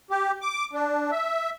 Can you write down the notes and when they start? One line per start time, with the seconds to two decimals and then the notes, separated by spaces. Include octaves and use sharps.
0.10 G4
0.42 D6
0.73 D4
1.11 E5